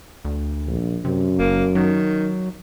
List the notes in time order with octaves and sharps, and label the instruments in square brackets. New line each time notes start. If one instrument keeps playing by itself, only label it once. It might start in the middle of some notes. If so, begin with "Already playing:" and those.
[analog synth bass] D2
[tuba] A#1
[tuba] F#2 [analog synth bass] C3
[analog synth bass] F#1 [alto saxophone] A#3
[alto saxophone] D#3 [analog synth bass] F#3